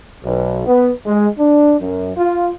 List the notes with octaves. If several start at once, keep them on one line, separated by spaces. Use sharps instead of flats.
B1
B3
G#3
D4
F#2
F4